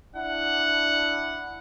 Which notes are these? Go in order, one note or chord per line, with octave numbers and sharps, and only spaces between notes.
D4 E4 F#5